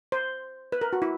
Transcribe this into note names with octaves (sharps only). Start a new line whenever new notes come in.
C5
B4
A#4
F#4
E4